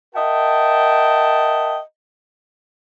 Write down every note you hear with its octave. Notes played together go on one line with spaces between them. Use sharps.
A#4 D#5 E5 F#5 G5 A5